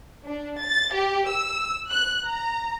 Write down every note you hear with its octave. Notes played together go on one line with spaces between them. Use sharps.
D4
A6
G4
E6
F#6
A#5